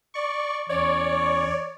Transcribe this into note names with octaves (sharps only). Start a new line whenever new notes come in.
D5 C#6
E2 C#4 C#5 D5 C#6